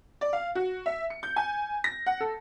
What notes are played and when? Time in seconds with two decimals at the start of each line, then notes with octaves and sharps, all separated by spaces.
0.21 D5
0.33 F5
0.55 F#4
0.86 E5
1.10 C#7
1.23 G6
1.36 G#5
1.84 A#6
2.06 F#5
2.21 A4